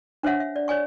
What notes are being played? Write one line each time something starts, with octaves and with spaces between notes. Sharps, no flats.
D4 C5 C#5 E5 F#5
E5
D5
C#5 D5 G#5 C#6